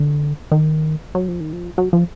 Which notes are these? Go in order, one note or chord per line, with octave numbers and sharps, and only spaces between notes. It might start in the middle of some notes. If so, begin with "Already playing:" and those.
Already playing: D3
D#3
F#3
F3
D#3
F3
F#3
F3